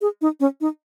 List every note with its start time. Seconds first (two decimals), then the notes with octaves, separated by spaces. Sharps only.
0.01 G#4
0.21 D#4
0.40 C#4
0.61 D#4